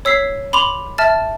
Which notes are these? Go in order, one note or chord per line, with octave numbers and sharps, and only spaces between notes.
C#5 E6 B6 C7
B5 C6 D6 F7
E5 A5 F6 A6